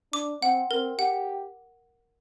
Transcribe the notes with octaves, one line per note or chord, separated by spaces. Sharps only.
D4 D6
C4 F#5
C4 A#4
G4 F#5